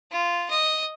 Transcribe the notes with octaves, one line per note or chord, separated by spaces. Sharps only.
F4
D#5